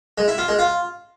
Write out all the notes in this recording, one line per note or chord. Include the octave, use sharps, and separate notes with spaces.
G#3
E4
F4
G#3
F4